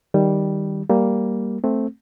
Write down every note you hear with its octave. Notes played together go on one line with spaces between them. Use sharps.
D#3 G3
G3 A#3
A3 C4